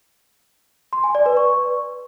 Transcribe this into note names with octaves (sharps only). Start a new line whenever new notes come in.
C6
G#5
D5
B4
C#6